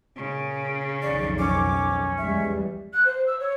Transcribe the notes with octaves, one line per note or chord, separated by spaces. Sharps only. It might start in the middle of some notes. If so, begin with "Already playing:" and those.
A#2 C#3
B1 F2 D#3 D5
C#4 D6
E2 G3 G#3 E5
F#6
C5
E6
C#5